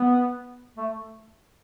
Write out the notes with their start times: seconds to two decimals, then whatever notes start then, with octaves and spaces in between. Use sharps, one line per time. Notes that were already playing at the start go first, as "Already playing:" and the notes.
Already playing: B3
0.77 A3